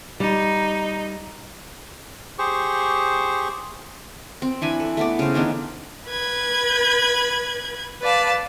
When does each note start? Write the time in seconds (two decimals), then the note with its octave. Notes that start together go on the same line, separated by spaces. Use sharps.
0.20 G3 D#4
2.39 G4 G#4 C5 C#6
4.42 C4
4.62 E3 D4 G#5 B5
4.80 A4
4.97 A3 B3 D5
5.19 C#3 C5
5.34 D#3 B3 D4 D#4
6.08 B4 B5 G#6
8.01 B4 D5 F5 A5